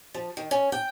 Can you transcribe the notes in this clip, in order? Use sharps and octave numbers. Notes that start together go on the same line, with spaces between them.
F3
D#3
C#4
G5